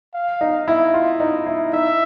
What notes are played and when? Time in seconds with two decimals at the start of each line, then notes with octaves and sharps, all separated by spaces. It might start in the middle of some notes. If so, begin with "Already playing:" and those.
0.14 F5
0.41 D#4
0.68 E4
0.94 F4
1.20 D#4
1.46 E4
1.73 D#4 E5